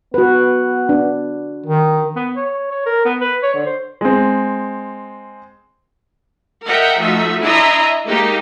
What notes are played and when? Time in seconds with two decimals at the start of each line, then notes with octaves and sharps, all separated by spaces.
0.14 B3 F#4 B4
0.89 D4
1.66 D#3
2.16 B3
2.36 C#5
2.71 C#5
2.86 A#4
3.05 B3
3.21 B4
3.43 C#5
3.54 D3
3.66 C5
4.01 G#3 C4
6.64 A#4 D#5 E5 F#5 G5
6.98 F3 A3 D#4 F#4 E5
7.42 D4 E4 D#5 E5 A#5 C6
8.07 G#3 A#3 D#4 G4